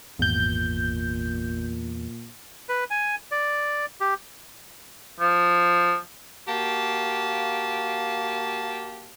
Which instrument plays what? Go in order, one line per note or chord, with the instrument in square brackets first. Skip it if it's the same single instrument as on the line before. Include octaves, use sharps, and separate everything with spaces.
[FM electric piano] G#1 G6 [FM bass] E2 [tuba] A#2
[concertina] B4
G#5
D5
G4
[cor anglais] F3
[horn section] A#3 F#4 G4 F5 A5